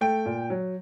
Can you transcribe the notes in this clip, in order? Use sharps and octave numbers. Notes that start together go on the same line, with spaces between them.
A3 G5
A#2
F#3